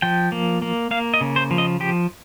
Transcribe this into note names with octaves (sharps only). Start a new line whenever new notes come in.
F3 G5
A#3
A#3
A#3 F5
D#5
C#3
C5
F3
D#5
F3 G4